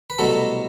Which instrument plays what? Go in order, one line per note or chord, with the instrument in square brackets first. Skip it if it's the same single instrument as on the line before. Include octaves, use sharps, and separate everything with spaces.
[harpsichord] B4
C2 B2 F#3 A3 A4